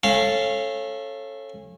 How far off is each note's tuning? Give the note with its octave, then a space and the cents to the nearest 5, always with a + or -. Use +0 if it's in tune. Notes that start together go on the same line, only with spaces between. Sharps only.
C#4 -25 A4 +0 F5 -20